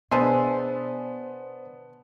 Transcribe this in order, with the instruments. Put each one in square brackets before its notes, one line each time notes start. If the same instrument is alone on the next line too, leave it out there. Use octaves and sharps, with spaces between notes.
[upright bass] B2 [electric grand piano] B3 [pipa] D4 G#4 E5 [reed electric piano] C5 A5 C6